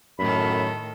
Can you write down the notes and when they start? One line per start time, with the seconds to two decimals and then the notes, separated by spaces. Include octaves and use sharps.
0.19 F#2 A2 D#3 A4 B5